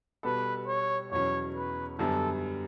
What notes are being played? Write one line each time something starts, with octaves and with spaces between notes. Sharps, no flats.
B2 G3 B3 F#4 A4 B4
C#5
E2 B2 F#3 C#4 C#5
B4
F#2 D3 G3 B3 A4